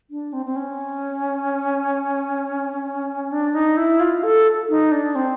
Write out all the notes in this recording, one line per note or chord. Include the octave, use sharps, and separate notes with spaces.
D4
C4
C4
C#4
D4
D#4
E4
F4
A4
D#4
D4
C4